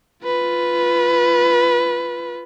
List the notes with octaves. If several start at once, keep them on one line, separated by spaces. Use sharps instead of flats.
F4 B4